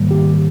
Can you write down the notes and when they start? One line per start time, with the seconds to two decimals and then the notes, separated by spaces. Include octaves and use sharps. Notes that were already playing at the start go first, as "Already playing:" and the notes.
Already playing: G#2 D#3 G3 A#3
0.11 G4